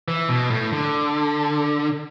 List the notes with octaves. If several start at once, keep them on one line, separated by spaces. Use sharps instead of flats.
E3
B2
A2
D3